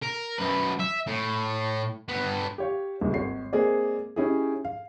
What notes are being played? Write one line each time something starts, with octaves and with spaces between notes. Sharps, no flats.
A#4
F#2 B4
E5
A2
G2 B3
G4 C#5 F5
D#1 C#2
G#1 C#5 C7
G#3 A#3 C4 G#4 A#4 D5
C#4 D#4 E4 G4 G#4
F5